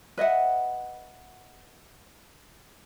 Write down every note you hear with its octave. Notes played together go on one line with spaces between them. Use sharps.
B4 D#5 E5 F#5